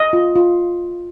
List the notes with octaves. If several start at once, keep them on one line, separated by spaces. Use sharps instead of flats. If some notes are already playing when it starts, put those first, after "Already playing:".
Already playing: D#5
F4
F4